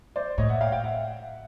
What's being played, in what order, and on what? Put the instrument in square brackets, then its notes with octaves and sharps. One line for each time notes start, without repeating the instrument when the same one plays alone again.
[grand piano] C5 D5
[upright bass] A2 [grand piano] C#5 D#5
[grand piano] E5 F#5
F5 G5
F5 G5
E5 F#5